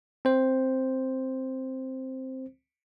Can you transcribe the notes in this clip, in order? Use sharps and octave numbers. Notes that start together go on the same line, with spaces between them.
C4 C5